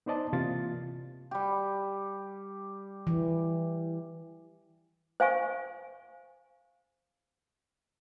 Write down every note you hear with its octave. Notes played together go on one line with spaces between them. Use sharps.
B3 D#4 C5 D5 D#5 A5
C3 E3 A#3 F4 A6
G3 G4
E3
C5 F5 G#5 C#6